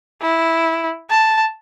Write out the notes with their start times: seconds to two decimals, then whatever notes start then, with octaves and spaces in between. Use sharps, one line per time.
0.22 E4
1.10 A5